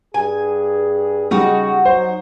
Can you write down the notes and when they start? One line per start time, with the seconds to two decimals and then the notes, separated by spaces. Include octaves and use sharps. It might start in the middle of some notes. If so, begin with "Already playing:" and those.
0.14 G2 G#4 G#5
1.31 C#3 G3 D#4 F#4 G#4
1.85 F#3 C5